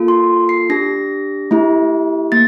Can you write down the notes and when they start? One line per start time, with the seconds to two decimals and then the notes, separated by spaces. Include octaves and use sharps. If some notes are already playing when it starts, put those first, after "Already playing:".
Already playing: A#3 F4 A4
0.08 C6
0.49 C7
0.70 D4 G4 A#6
1.51 A3 E4 G4
2.32 A#3 A6